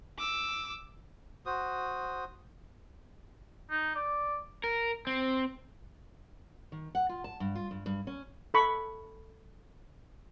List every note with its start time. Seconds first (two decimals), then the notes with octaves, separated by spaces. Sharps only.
0.19 D6 E6
1.46 F#4 C5 D#6
3.70 D#4
3.95 D5
4.64 A#4
5.07 C4
6.72 D#3
6.95 F#5
7.09 F4
7.24 A5
7.40 G2
7.55 F4
7.71 G2
7.86 G2
8.07 C#4
8.54 A4 A5 B5 C#6